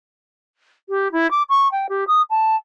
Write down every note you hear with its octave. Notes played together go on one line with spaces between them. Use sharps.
G4
E4
D6
C#6
G5
G4
D#6
A5